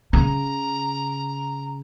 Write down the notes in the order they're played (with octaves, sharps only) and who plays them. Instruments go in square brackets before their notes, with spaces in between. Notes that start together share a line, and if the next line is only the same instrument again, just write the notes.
[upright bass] C#3 [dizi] A#5